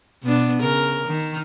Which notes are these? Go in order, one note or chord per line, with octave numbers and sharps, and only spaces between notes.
B2 B3 D4
C#3 A#4
D#3